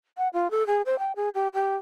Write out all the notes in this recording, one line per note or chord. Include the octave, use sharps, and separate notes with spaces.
F#5
F4
A4
G#4
C5
G5
G#4
G4
G4